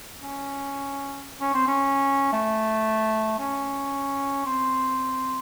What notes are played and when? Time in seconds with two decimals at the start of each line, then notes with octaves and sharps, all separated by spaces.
0.20 C#4
1.40 C#4
1.54 C4
1.67 C#4
2.33 A3
3.39 C#4
4.46 C4